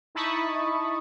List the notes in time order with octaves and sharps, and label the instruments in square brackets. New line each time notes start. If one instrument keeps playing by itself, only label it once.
[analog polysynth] D#4 E4 A5 B5 C#6 D#6